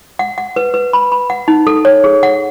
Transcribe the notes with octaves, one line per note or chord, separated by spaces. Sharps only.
F#5
F#5
B4
B4
B5
B5
F#5
D#4
A4
C#5
G#4
F#5